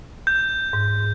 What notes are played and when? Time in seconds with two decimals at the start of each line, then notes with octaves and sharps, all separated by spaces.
0.27 G6
0.73 G#2